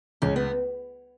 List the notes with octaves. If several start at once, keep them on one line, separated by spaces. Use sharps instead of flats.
C#2 C#4
B3